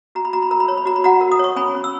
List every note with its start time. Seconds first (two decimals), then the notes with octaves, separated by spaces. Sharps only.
0.15 F#4 A#5
0.25 B5
0.33 F#4 A#5
0.42 B5
0.51 A#4 A#5
0.60 B5
0.68 C#5 A#5
0.77 B5
0.86 F#4 A#5
0.96 B5
1.04 F#4 F#5 A#5
1.21 A#4
1.32 D#6
1.39 C#5 C#6
1.56 C#4 G#5 B5
1.75 C#4
1.84 E6